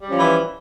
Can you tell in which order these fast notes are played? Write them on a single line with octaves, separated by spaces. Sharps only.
G3 C#4 F3 F4 E3